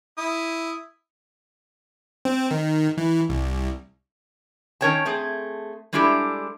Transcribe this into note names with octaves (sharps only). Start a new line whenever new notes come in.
E4 D#6
C4
D#3
E3
C2
D#3 C#4 A#4 C#5 G5 A5
A3 C4 G#4
G3 G#3 D4 E4 G4 A4